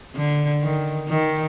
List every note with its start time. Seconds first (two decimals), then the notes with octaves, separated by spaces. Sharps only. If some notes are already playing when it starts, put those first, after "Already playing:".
0.15 D3
0.62 D#3
1.09 D#3